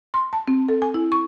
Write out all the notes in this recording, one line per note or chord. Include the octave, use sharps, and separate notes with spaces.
C6
A5
C4
A4
G#5
E4
C#6